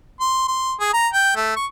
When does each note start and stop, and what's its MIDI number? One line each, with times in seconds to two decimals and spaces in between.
0.20 0.44 84
0.48 0.72 84
0.80 0.93 68
0.94 1.08 82
1.13 1.34 79
1.36 1.56 57
1.56 1.66 85